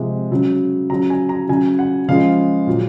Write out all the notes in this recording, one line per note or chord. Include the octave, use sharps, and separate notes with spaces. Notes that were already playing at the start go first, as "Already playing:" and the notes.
Already playing: C3 F3 G#3
C#3 F#3
C#3 F#3 A#5
G#5
A#5
C#3 F#3 G#5
F#5
C#3 F3 G#3 F5
A#2 F#3